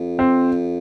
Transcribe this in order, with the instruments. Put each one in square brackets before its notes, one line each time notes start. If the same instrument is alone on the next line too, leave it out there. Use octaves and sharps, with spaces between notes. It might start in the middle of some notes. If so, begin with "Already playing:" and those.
Already playing: [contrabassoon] F2
[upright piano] C4